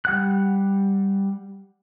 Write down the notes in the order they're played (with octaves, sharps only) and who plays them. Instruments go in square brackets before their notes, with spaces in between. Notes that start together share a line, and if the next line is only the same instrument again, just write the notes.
[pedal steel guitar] G3 F#5 F#6